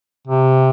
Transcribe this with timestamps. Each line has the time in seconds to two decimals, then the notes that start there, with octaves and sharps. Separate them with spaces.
0.27 C3